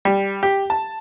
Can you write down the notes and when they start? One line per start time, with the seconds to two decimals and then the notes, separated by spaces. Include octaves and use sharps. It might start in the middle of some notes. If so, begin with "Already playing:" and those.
0.05 G3
0.43 G4
0.70 A5